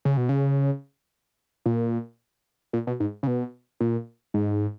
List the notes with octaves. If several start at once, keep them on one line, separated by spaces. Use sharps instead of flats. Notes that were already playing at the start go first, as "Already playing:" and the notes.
C#3
B2
C#3
A#2
A#2
B2
G#2
C#3
B2
A#2
G#2